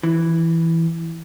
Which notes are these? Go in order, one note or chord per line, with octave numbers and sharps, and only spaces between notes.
E3